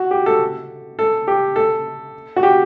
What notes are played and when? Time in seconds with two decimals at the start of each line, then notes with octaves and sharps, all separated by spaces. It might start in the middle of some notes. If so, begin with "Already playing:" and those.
Already playing: F#4
0.11 G4
0.26 A4
0.99 A4
1.28 G4
1.56 A4
2.36 F#4
2.43 G4